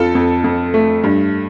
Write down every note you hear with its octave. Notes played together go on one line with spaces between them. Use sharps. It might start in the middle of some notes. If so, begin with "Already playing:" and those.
Already playing: F2 F4 A4
F2
F2
A3
G2